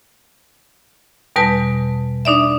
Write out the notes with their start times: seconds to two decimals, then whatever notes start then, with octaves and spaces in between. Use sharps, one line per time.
1.36 E2 B2 G3 B4 A5
2.25 D4 D#4 D5 E5